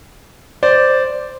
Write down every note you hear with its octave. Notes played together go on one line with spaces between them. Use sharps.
C5 D5